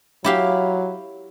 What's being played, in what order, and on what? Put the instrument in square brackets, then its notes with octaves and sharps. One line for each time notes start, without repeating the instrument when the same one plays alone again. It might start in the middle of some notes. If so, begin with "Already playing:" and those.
[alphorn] F#3 [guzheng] E4 G4 F5